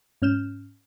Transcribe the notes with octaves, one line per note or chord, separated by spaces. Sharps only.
G#2 C#4 F6 G6 E7